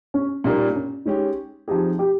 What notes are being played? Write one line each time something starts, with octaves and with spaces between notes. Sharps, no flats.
C#4
A#2 G3 A#3 C#4 D#4
C#4
G#3 C#4 D#4 G4
F3 C4 D#4 G4 G#4
G4